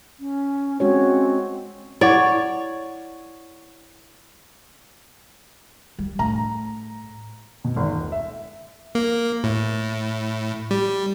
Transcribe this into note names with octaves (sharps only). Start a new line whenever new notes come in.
C#4
G#3 C4 C#4 F#4 C#5
E4 C#5 D5 F#5
G3
A2 A#5
B2
G#1
D#1
E5
A#3
A2
G3